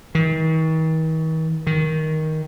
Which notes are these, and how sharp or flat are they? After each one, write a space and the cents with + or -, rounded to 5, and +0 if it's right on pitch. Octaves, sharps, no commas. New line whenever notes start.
D#3 +45
D#3 +10